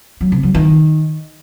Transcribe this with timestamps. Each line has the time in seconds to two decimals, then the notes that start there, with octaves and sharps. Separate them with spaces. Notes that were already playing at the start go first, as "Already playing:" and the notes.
0.21 F#3
0.32 C3
0.43 F#3
0.55 D#3